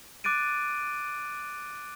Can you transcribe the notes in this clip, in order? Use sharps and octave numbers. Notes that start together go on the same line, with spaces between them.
D6 F#6 A6 D7 D#7